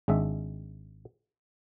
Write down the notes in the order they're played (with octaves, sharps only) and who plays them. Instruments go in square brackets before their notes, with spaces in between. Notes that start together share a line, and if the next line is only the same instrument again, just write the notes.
[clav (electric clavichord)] G#1 G#3 D4 E5